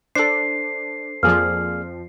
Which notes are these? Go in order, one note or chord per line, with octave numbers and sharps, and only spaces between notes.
D4 A4 C5 C7
F2 F3 A#3 G#4 D5 F6